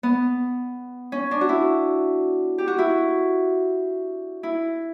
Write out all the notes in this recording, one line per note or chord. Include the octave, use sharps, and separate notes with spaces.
B3
C#4
D4
F#4
E4
G4
F#4
E4
E4